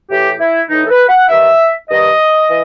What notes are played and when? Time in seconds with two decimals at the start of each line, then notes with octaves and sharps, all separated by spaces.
0.09 A2 E3 G4
0.39 E4
0.68 A2 E3 D#4
0.84 A4
0.89 B4
1.08 F#5
1.28 G2 D#3 E5
1.88 G2 D#3 D#5
2.48 E3